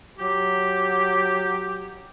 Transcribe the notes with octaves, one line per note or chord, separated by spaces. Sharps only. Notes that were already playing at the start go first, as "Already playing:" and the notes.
F#3 G4